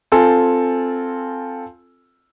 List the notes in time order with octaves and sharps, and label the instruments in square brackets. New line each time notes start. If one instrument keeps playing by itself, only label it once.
[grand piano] C4 F4 A4 G#5